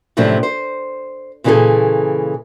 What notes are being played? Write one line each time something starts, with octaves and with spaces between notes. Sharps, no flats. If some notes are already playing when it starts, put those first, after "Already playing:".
F#2 A2 C3 F3 A3 D4
C5
A#2 C#3 E3 C#4 G#4 A4